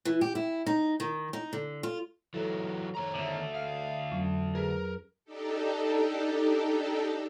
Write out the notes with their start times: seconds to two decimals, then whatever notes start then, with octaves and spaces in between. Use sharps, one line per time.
0.05 E3
0.21 G4
0.35 E4
0.66 D#4
1.00 D#3
1.33 D#4
1.53 D3
1.83 F4
2.34 E3 F#3 A4
2.95 D#3 C#5 A#5
3.15 D3 A3
3.55 F5
4.11 F2 F#3 C#4
4.55 G#4 A#4 B4
5.25 D4 D#4 G4 A4